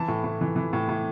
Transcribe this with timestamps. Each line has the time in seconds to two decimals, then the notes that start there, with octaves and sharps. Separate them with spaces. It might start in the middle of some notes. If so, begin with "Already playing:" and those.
Already playing: E3 A5
0.08 A2
0.24 A2
0.41 E3
0.56 E3
0.73 A2
0.89 A2